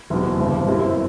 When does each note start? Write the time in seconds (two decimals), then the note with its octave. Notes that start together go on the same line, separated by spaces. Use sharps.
0.10 F#1 E2 B2
0.39 G2 D3 G3 C4 G4
0.67 G1 F#2 F#3 C4 E4